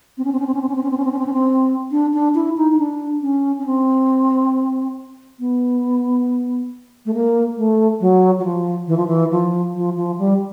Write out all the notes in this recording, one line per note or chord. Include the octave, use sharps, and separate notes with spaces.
C4
C#4
C4
C#4
C4
C#4
C4
C#4
C4
C#4
C4
C#4
C4
C#4
C4
C#4
C4
D4
D4
E4
D#4
D#4
D4
C#4
C#4
C4
B3
A3
A#3
A3
F#3
F#3
F3
E3
F3
E3
F3
F3
F3
G3